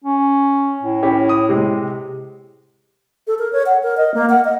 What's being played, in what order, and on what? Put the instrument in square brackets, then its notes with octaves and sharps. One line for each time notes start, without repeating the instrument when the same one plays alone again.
[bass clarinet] C#4
A2
[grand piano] C#4 E4 G4
D#6
C3 G#3
[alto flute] A4
A#4
C#5
F#5
A#4
D#5
A#3
F#5
D#5